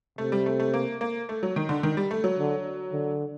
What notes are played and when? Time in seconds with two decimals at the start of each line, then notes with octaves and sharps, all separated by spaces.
0.18 C3 A3
0.32 G3
0.46 A3
0.60 A3
0.74 A#3
1.01 A#3
1.29 A3
1.43 F#3
1.56 D#3
1.69 D3
1.83 D#3
1.97 G3
2.11 A3
2.24 F#3
2.39 D3
2.92 D3